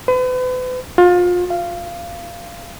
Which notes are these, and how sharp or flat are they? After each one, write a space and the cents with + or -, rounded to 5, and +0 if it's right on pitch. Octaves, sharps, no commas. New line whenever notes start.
B4 +40
F4 +30
F5 -20